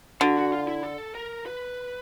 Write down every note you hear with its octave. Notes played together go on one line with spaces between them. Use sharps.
D3 F#4
F#4
F4
E4
A4
A#4
B4